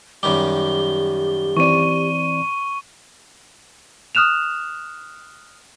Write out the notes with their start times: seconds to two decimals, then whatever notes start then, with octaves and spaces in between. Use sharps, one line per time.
0.23 F#2 D#3 G3 G4 D6 G7
1.57 E3 C4 D5 C#6 D#7
4.15 D#6 F6 F#6 E7 F7